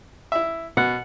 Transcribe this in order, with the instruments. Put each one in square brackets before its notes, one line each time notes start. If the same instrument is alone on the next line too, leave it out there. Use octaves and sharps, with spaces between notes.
[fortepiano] E4 E5
[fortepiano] B2 [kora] F#5